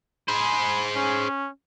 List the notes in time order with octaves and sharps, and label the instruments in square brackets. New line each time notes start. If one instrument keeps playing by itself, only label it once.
[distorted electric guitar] G#4 C5 [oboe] B5
[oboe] C#4